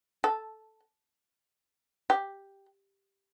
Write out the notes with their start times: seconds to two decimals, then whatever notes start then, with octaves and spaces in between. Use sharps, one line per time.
0.24 A4
2.10 G4